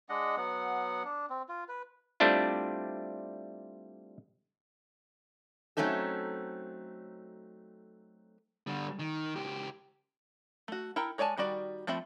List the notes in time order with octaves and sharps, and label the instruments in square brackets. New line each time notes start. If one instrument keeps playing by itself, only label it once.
[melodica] G#3 D4 D#5 F#5
F#3 B3 F#5
D4
C4
F4
B4
[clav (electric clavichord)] G3 A3 C4 D4 E4 F4
[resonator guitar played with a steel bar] F#3 A3 C4 C#4 D#4 A4
[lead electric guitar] D3 G3
D#3
C#2 G4
[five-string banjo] A3 F#4
E4 A4 A#4 G5
G#3 C#5 D5 G#5 A5
D#3 G3 F#4 D5
F3 A3 C4 E5 B5